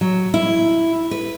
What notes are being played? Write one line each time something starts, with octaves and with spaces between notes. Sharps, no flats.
F#3
E4
B4